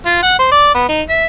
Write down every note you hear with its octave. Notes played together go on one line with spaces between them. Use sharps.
F4
F#5
C5
D5
B3
D#4
E5